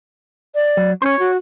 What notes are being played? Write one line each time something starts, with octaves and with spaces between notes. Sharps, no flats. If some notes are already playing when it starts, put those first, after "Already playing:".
D5
F#3
C#4 C5 C#5
F#4